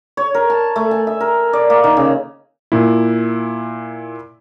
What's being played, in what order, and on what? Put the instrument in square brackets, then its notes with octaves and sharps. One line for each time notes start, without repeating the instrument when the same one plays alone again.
[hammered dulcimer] C#5
A#4
A5
A3
G#5
E5
A#4
D5
A#3
D#3
C#3
[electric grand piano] A#2 E4